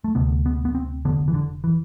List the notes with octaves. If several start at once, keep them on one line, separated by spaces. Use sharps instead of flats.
A3
D2 C3 B3
B3
B3
C4
F1 E2 D3 B3
E3
D3
E3